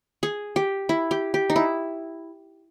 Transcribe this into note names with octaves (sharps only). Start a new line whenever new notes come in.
G#4
G4
E4
G4
G4
D#4
E4